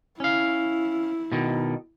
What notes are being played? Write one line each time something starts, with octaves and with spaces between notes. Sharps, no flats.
C#4 E4 F5
B2 D#3